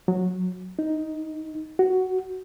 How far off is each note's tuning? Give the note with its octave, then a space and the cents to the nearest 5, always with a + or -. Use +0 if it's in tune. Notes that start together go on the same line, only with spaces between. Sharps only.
F#3 -15
D#4 +5
F#4 +10